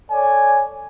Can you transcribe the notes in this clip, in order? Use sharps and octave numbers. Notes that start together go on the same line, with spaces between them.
A4 C#5 D5 G#5